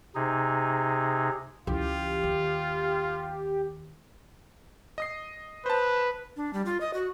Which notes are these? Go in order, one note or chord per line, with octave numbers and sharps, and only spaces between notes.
C3 D#4 G#4
C#2 E3 F4 G4
D#2
D#5 D#6 C7
B4 C5 A5
D4
G3
F4
D#5
F#4